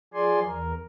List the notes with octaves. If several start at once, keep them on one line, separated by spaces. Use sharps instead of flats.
F3 G#4 D5 G#5 C6
E2 A#4